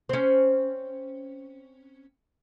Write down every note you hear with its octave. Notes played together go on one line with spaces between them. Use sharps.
C4 C#4